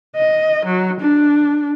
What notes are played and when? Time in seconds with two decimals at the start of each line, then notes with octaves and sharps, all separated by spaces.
0.16 D#5
0.65 F#3
1.00 D4